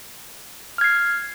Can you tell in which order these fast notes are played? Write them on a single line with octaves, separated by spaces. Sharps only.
F6 G#6 C7